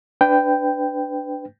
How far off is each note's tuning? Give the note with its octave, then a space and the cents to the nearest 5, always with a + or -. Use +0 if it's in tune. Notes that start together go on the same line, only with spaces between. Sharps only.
D4 +0 B4 +30 G5 +0